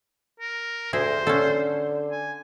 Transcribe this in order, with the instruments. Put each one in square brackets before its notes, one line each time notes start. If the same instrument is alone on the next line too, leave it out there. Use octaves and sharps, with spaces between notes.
[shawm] A#4
[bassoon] D2 [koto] G#4 E5 [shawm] C5
[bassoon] D3 [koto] C#4 A4
[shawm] G#5